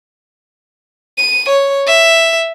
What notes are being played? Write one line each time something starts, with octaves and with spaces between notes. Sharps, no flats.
D#7
C#5
E5